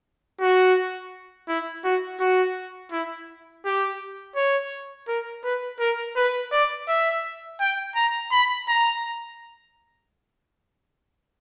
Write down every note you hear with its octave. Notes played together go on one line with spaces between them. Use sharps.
F#4
E4
F#4
F#4
E4
G4
C#5
A#4
B4
A#4
B4
D5
E5
G5
A#5
B5
A#5